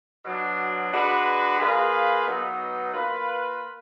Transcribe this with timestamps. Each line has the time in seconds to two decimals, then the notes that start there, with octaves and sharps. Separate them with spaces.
0.24 B2 F#3 D4
0.92 G#3 D4 F#4 B4
1.59 A#3 F4 G#4 B4
2.25 B2 F#3 B3 D#4
2.92 A#3 F4 B4